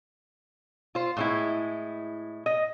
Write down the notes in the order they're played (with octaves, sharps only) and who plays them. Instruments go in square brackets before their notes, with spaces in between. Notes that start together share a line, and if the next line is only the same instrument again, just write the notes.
[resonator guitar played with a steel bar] F4 C5
A2 G#3 E4
D#5